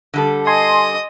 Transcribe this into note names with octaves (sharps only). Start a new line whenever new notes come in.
D3 G3 A4
D#5 G#5 C6 D#6